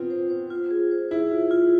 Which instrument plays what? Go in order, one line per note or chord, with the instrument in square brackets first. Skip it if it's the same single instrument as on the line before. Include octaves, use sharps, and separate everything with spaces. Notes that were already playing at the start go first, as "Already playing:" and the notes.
Already playing: [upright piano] B3 C4 [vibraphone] F4
[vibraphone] C5
C5
F4
G#4
C5
[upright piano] E4 [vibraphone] G#4
[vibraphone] F4
F4